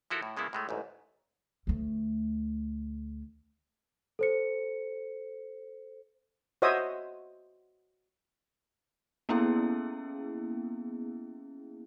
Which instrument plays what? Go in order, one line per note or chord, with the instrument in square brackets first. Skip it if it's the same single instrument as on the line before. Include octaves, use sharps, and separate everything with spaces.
[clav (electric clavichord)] F3 E4 F#4 A4 A#4
A2
C#3 G#3 A#3 B3 E4
A2 G#3 A3
A1 D2 G#2
[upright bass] D2 A3
[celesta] A4 C5 C#7
[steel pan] F#4 C5 C#5 D#5 E5 D#6
[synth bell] A#3 B3 C#4 E4 G#4